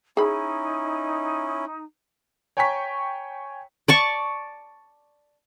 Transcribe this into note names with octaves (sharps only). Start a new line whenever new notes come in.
C#4 D#4 E4 G#4 B5
C#5 G5 G#5 A#5 C#6 B6
D5 A5 C#6